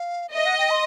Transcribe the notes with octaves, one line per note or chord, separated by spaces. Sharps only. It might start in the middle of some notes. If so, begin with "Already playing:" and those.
Already playing: F5
D#5 E5
F#5
G5
C6